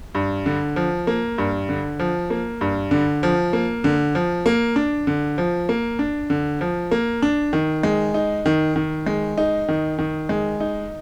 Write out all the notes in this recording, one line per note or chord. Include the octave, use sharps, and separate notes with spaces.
G2
D3
F3
A#3
G2
D3
F3
A#3
G2
D3
F3
A#3
D3
F3
A#3
D4
D3
F3
A#3
D4
D3
F3
A#3
D4
D#3
G#3
D#4
D#3
D#3
G#3
D#4
D#3
D#3
G#3
D#4